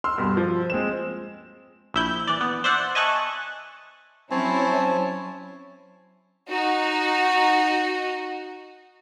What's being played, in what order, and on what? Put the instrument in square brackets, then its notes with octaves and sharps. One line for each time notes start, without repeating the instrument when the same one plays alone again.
[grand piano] C6 E6 F6
D#1 G2 B2
F3
G#3 C4 E7
[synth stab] A#1 E4 G6
E3 D5
B3
C5 D5 E5 F#5
D#5 E5 G#5 A5 C#6 F#6
[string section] F#3 C#4 E4 [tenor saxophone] C4 [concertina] C#5 G#5 A5
[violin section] D#4 F#4